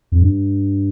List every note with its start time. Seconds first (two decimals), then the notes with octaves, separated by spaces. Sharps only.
0.12 F2
0.21 G2